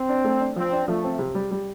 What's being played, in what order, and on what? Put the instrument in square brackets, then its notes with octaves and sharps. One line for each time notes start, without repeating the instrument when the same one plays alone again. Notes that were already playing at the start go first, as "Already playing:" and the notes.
Already playing: [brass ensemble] C4
[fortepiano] D4
A3
D4
[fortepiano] F3 [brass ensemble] C4
[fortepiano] D4
[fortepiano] F3 [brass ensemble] A3
[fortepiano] C4
C3
G3
G3